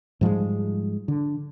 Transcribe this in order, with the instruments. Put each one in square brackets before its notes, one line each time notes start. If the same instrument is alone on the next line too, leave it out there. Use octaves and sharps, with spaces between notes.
[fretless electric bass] G#2 F3 G3 G#3
D3